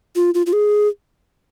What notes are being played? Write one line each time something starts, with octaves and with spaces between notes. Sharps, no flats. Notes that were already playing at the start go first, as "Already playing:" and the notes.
F4
F4
F4
G#4